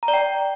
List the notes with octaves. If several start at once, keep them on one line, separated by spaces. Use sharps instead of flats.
A#5
D5
G5